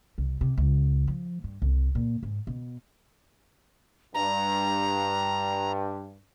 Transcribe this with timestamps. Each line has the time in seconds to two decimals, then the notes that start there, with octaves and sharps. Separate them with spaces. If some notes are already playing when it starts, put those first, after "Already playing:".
0.18 C2
0.41 C3
0.57 C#2
1.07 F3
1.44 G2
1.62 C2
1.95 A#2
2.23 G#2
2.47 B2
4.14 G2 A#5